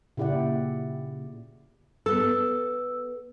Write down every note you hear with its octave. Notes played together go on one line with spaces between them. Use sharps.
A#2 C#3 E4 G4 D5 F#5
B3 A4 E6